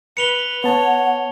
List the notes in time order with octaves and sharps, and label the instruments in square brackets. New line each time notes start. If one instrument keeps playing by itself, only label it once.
[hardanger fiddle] B4 [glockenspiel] C#7 F7 G7
[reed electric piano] B3 A5 [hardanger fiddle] C#5 [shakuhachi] F#5